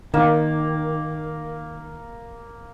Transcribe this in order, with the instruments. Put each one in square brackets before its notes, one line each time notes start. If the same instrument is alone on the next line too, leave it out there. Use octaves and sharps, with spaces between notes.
[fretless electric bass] D#3 [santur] A#3